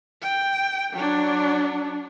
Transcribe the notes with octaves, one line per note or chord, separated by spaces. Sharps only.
G5
F#3 D4